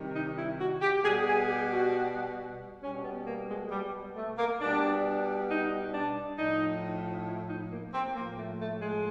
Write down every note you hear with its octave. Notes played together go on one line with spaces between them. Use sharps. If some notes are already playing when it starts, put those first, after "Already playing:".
Already playing: C3 D#3 G3
D#4
E4
F#4
G4
B2 G3 G#4
G#4
G4
F#4
B2 G3 C#4
B3
A#3
G#3
G3
A3
A#3
B2 G3 D4
D#4
D4
A2 F3 D#4
E4
D#4
A#3
C4
A2 F3 A#3
A3
A3
G#3